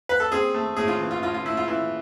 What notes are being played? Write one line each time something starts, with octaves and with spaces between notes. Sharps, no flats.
B4
A4
C4 G#4
A3
A2 G#4
F4
E3
F4
A2 F4
F4
A2 E4
F4
E3 E4